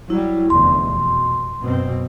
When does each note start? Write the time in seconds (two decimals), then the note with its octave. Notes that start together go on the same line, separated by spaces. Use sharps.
0.10 F#3 G3 E4
0.50 F1 E2 D3 C6
0.88 B2
1.62 F#2 B2 C4